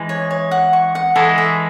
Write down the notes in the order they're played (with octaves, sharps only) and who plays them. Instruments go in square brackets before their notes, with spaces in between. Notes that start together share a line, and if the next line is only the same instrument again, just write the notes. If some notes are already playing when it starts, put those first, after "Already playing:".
Already playing: [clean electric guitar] E3 G#3
[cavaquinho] C#5
C#5
F#5
C#6
F#5
[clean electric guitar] E3 G#3 [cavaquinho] A4
[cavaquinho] E5